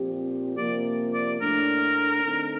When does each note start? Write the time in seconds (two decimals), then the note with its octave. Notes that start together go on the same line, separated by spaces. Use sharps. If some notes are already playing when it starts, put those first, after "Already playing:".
Already playing: A#2 F3 C4 G4
0.57 C3 F3 A#3 D5
1.14 D5
1.41 A2 A3 D4 A#4
2.24 D3 A3 C4 D#4 A4